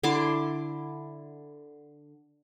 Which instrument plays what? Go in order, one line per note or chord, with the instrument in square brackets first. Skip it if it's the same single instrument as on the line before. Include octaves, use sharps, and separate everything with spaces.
[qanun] D3 E4 C6 D6